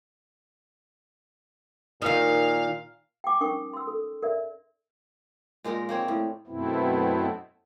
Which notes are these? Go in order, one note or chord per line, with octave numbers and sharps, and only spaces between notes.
A#2 D#3 D#4 F5
G5 G#5 D6
C#4 D#4 A#4 G5 C#6 D#6
C6 E6
A4
A#4 D5 E5
A#2 G#3 D#4 A#4
A#3 C4 C#5 D5
A2
F#2 B2 A3 B3 C4 E4